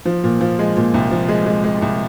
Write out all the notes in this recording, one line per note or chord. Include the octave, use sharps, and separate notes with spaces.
F3
A#2
F3
G#3
A#2
C2
F3
G#3
G#3
G#3
C2